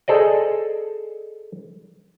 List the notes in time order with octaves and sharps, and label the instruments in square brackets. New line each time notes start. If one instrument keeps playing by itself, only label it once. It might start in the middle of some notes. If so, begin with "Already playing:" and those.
[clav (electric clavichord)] G#4 A4 C5 D5 D#5